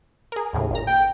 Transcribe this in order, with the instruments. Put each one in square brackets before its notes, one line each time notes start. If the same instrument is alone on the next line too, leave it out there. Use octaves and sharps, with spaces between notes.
[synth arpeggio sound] G#4 A#4
D#2 A2 C#3
G#1 A#2 A#5
[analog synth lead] G5